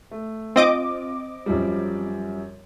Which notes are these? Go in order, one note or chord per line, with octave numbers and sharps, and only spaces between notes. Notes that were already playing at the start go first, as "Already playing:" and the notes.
A3
C4 F4 D#5 D6
F#2 F3 G3